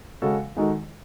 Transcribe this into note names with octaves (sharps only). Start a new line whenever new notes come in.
C#3 G#3 C#4 F#4 A4
D#3 G#3 D#4 F#4 A4